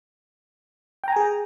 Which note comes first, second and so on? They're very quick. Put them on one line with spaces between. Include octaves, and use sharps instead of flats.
G5 A#5 G#5 G#4